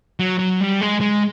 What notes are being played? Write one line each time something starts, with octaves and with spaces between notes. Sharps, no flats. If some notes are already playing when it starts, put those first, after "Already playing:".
F#3
F#3
G3
G#3
G#3